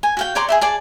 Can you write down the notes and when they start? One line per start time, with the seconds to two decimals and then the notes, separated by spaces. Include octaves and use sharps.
0.03 G#5
0.17 F#4 F5 G5
0.35 C#5 D5 A#5 C6
0.49 G#4 C5 E5
0.61 G#4 D5 A5